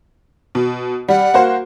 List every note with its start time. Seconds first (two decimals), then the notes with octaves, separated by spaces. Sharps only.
0.55 B2
1.09 G3 F#5
1.34 A#3 F#4 C5